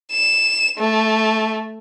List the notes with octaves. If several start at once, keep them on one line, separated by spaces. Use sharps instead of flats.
E7
A3